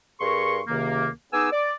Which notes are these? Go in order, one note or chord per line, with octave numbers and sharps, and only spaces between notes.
G2 G#4 A#4 C6 C#6
C#2 C3 D#3 A#3
B3 D#4 G#4 G#5 D6 E6
D5